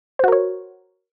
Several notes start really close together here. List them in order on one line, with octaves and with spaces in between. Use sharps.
C5 F#4 A#4 C#5